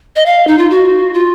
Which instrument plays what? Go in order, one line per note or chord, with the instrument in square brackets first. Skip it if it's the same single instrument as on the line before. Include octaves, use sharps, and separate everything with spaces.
[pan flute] D#5
F5
D#4
F4
F#4
F4